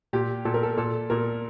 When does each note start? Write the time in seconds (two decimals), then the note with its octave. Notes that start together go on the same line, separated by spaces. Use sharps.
0.13 A#2 G4
0.45 A#2 A4
0.54 A#4
0.63 A4
0.77 A#2 A4
1.10 A#2 A#4